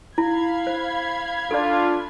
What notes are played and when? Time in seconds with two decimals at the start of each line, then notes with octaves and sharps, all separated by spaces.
0.18 E4 F5 B5 G#6
0.67 C5
1.51 D4 F4 A4 D5